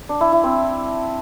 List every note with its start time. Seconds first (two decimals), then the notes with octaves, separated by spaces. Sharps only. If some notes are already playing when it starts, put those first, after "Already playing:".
0.09 D4
0.21 E4
0.32 E4
0.44 C4